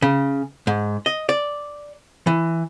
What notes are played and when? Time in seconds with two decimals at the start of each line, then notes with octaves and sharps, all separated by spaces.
0.02 C#3
0.67 G#2
1.06 D#5
1.29 D5
2.27 E3